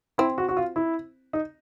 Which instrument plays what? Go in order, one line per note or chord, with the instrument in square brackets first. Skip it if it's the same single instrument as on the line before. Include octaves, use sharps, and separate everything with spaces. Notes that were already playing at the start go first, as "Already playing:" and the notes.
[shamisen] C4 [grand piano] E4
[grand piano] F#4
F#4
F4
E4
D#4